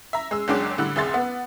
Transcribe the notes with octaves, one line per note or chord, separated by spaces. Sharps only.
E5 A#5
G#3 E6
F#1 F#3 G#3 D4 G5 D6
A2 D3 G3 E6 F#6
F1 C2 G#4 E5 C6 A6
B3